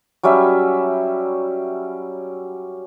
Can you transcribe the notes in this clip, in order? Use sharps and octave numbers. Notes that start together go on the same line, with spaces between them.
F#3 G3 C#4 E5